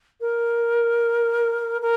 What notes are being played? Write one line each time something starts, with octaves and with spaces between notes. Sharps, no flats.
A#4
A#4